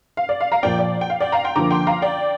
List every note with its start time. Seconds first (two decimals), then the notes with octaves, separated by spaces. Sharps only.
0.17 F5
0.29 D5
0.41 F5
0.52 F5 A#5
0.63 A#2 F3 A#3 D5 G5
0.79 D5
1.01 G5
1.10 F5
1.20 D5 G5
1.32 F5 A#5
1.44 G5 C6
1.56 D3 F3 A#3 A#5 D6
1.71 G5 C6
1.87 F5 A#5
2.02 D5 G5